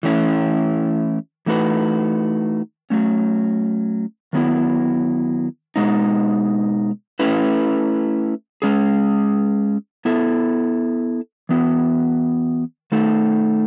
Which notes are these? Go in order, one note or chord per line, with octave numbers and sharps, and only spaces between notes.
E3 A3 C#4 E4
E3 A3 D#4 F#4 B4
F#3 A3 C#4
D#3 F#3 B3 E4
B2 G#3 D#4
A3 C#4 E4 B4
G#3 C#4 G#4
B3 E4 A4 E5
E3 B3 F#4
D#3 A3 D#4 A4